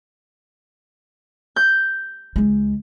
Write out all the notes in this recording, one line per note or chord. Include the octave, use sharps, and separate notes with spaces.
G6
C#2 G#3